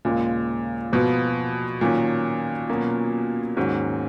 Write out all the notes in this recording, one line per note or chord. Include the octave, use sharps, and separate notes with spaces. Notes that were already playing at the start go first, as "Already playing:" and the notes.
D#2 A#2 C#3 G#3
B2 F3 B3 F4 B4
A#2 D#3 F#3 C#4
B2 F#3 A#3 C#4
D#2 G#2 D#3 F#3 C#4 F#4